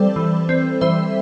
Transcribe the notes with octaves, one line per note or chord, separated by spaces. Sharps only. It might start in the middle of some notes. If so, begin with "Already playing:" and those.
Already playing: E3 G3 C4 A4 C5 D5
E3
C4
E3 C5 E5